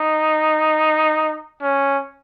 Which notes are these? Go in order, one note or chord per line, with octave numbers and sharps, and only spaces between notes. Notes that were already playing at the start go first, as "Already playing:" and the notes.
Already playing: D#4
C#4